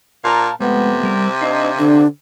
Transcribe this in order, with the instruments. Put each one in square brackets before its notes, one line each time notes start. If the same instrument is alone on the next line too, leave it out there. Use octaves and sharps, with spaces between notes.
[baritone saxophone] A#2 [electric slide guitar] F5 A5 A#5
[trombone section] F2 A3 B3 [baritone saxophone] C3 [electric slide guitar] G#3
[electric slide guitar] G3 A#4
[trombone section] D4 D#4 [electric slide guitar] F5
[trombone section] D3 [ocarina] D4